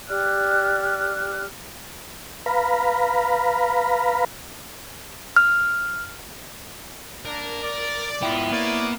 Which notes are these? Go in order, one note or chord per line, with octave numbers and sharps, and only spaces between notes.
G4 D5 F6 F#6
B4 F5 A#5 B5
F6
A#3 D4 A#4
D5
G#2 B3 E4 F4 G5
A#3 C#5 D5